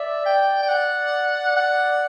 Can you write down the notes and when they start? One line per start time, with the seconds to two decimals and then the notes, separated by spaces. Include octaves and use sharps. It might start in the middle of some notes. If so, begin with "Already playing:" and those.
Already playing: D5 E5
0.26 G5
0.63 G5
0.69 F#5
1.56 F#5